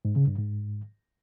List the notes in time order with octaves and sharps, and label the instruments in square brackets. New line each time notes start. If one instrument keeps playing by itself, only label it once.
[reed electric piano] G#2
C#3
G2
G#2